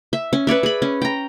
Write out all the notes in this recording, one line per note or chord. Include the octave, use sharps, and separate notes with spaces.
E5
C#4
B4 C#5 D5 E5
G#4 B5
C#4
G5 A#5